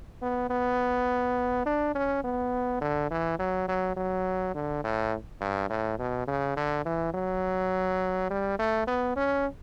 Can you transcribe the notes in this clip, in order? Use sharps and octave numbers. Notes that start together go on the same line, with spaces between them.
B3
B3
D4
C#4
B3
D3
E3
F#3
F#3
F#3
D3
A2
G2
A2
B2
C#3
D3
E3
F#3
G3
A3
B3
C#4